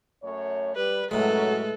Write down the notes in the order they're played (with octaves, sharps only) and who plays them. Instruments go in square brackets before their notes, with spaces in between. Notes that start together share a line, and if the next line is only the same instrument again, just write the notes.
[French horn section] F#2 A3 C#5
[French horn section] G3 [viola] B4
[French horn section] F#2 F#3 [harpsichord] A2 G#3 [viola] A4 B4